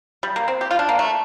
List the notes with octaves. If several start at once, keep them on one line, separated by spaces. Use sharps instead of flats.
G3
A#3
C4
G4
F4
D4
A#3
A3